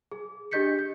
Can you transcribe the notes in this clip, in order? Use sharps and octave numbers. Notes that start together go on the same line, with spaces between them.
G#4
D4 G4 D#5 G6 B6 C#7
G6